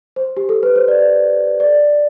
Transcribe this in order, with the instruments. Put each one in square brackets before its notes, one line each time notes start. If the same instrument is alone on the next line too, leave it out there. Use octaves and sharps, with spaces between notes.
[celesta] C5
G4
A4
B4
C5
D5
D5